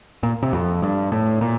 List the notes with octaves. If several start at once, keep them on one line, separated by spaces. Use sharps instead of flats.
A#2
C3
F2
G2
A2
A#2